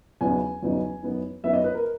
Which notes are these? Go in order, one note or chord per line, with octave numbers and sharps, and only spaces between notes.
E2 C#3 F#3 B3 D#4 G#5
E2 C#3 F#3 B3 D#4
F#2 E3 B3 D#4
F#2 E3 B3 D#4 E5
D#5
B4
A#4